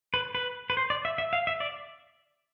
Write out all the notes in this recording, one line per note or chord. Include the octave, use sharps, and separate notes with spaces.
B4
B4
B4
C5
D5
E5
E5
F5
E5
D5